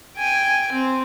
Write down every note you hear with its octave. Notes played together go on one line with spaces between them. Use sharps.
G5 G#5
C4